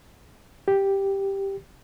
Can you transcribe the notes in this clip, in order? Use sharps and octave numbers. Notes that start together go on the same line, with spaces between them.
G4